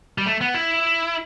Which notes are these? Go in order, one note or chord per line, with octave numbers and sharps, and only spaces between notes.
G3
A3
B3
E4